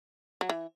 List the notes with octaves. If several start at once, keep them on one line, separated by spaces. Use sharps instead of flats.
F#3
E3